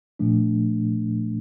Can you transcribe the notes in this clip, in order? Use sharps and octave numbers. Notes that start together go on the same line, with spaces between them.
A#2 F3 A3 D4